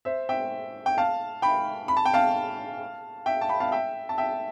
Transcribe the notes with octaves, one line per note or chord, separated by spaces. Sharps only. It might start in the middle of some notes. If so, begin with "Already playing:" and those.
C5 E5
E5 G5
G5
F5 A5
G5 B5
B5
A5
G5
F5 A5
E5 G5
A5
G5 B5
F5 A5
E5 G5
A5
E5 G5